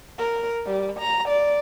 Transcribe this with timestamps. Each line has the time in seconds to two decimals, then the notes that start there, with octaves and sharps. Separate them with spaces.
0.19 A#4
0.66 G3
0.99 A#5
1.29 D5